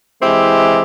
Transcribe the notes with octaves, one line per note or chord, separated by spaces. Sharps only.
E3 G#3 C4 E4 G4